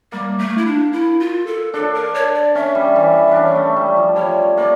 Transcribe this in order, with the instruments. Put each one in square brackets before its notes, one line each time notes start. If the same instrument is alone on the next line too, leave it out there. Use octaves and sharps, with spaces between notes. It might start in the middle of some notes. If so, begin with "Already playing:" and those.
[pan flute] G3 [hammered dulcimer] A#3
[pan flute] A3
E4
D4
E4
F4
A4
[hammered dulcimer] D4 [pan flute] A4
[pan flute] A#4
C#5
D5
[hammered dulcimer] C#4 [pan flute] E5
[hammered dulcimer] G3
E3
C#4 D4
A3
G3
F3
[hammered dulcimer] G3 [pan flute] C#5
[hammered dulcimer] A#3 [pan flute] D5